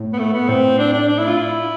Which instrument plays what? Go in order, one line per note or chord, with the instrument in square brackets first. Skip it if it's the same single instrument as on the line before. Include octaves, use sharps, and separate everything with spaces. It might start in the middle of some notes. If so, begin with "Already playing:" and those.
Already playing: [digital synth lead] A2
[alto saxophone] B3
A3
B3
[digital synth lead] A2 [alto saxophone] C4
[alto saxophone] D4
D4
D4
E4
F4
E4